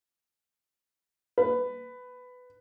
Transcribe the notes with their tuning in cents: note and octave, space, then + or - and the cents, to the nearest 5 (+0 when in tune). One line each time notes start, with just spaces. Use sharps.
B4 +15